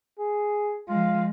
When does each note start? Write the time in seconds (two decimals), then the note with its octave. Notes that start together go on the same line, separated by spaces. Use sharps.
0.19 G#4
0.88 F3 G#3 F4